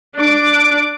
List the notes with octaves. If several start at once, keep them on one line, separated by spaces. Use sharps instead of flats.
D4 D6